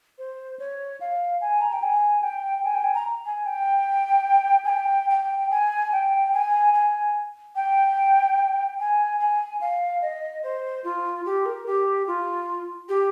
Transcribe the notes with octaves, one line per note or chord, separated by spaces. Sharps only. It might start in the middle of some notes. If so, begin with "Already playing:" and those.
C5
C#5
F5
G#5
A#5
G5
G#5
G5
G#5
G5
G#5
A#5
G#5
G5
G#5
G5
G5
G#5
G5
G#5
G#5
G5
G#5
G#5
F5
D#5
C5
F4
G4
A#4
G4
F4
G4